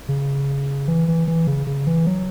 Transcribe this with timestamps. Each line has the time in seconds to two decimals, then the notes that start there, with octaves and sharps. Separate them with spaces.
0.09 C#3
0.88 E3
1.08 E3
1.28 E3
1.47 C#3
1.67 C#3
1.87 E3
2.06 F#3